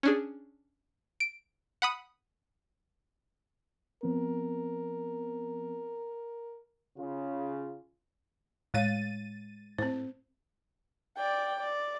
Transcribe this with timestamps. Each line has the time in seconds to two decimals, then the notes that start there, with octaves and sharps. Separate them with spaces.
0.03 C#4 D4 G#4
1.20 D7
1.82 F#5 B5 D#6
4.03 F3 B3 C4 A#4
6.97 C#3 F4
8.74 A2 G#3 C#5 F5 A6 D#7
9.78 A2 C4 C5
11.17 D5 G5
11.60 D5